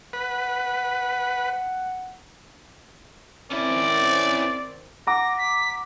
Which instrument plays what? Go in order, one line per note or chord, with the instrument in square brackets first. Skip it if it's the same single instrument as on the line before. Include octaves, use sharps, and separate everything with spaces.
[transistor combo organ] B4 [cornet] F#5
[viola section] D#3 C4 [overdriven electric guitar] C#4 E4 [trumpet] D5
[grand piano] F#5 A#5 D6 [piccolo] A#6
[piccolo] B6